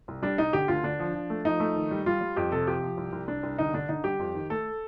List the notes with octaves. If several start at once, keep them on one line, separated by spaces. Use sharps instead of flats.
C2
G3 D4
C2 D#4
D3 G4
D2 F4
D3 D4
F3
F3
A3
F3 D#4
A3
D#3
G3
G3 F4
G3
F2 G4
C3 A4
F3 G4
F3
C2
C2
C2 D4
C2
D3 D#4
D3 D4
D3 D#4
G3 G4
F2
D#3
A3 A4